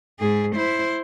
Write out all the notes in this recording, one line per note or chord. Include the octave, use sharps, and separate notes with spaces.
G#2 G#4
E4 C5